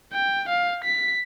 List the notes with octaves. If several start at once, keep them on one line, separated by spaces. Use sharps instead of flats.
G5
F5
B6